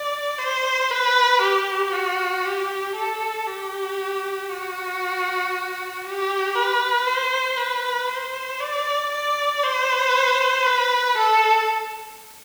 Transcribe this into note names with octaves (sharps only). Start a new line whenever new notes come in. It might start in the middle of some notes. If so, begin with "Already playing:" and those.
Already playing: D5
C5
B4
G4
F#4
G4
A4
G4
F#4
G4
B4
C5
B4
C5
D5
D5
C5
B4
A4